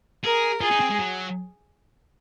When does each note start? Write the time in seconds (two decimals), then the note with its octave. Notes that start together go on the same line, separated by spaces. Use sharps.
0.24 G#4 A#4
0.61 F4 G#4
0.71 D#4
0.81 C4
0.90 G#3
0.99 F#3